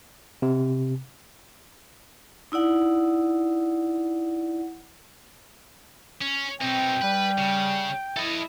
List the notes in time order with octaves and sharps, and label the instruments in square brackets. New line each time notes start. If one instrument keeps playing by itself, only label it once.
[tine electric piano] C3
[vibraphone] D#4 E4 D5 F#5
[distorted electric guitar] C#4
[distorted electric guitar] B2 D#4 [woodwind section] C4 [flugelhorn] G5
[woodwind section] G3 [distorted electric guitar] B4
[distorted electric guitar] C#3
[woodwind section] E4 [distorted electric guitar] A4 D#5